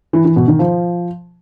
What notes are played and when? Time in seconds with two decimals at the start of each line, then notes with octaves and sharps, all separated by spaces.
0.13 E3
0.25 E3
0.36 B2
0.48 D#3
0.59 F3